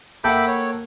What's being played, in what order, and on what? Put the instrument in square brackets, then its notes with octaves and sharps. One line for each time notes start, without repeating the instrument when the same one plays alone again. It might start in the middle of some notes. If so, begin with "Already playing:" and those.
[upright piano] A#3 F#5 [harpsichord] A4 G5 [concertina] E5 B5 D6
[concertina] C#5